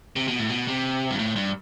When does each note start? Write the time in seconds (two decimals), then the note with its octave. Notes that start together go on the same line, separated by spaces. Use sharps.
0.16 C3
0.28 B2
0.38 A2
0.49 B2
0.68 C3
1.11 G2
1.19 A2
1.36 G2